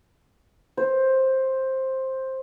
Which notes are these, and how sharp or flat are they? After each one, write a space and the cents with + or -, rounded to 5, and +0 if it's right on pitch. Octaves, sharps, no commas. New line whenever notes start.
C5 +10